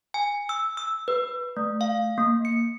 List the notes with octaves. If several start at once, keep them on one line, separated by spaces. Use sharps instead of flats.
G#5
E6
E6
B4
A3
F5
A#3
C#7